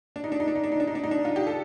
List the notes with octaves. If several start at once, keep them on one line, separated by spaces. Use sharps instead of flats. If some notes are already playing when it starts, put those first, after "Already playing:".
D4
D#4
D4
D#4
D4
D#4
D4
D#4
D4
D#4
D4
D#4
D4
F4
G4
A4